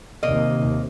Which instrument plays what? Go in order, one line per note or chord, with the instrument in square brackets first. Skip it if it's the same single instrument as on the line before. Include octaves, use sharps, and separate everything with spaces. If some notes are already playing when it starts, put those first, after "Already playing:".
[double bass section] D#2 C3 [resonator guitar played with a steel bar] A#3 D#5